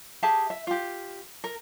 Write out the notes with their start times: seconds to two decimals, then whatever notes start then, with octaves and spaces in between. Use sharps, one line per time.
0.23 G4 G#4 E5 A5
0.50 E5
0.67 F4 G4
1.44 A#4